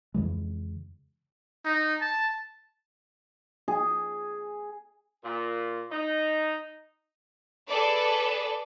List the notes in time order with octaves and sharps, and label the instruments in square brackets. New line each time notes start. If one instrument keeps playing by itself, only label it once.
[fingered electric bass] F2 C#3 E3 G#3
[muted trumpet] D#4
A5
[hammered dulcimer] G#4
[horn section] A#2
D#4
[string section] G#4 A4 B4 D5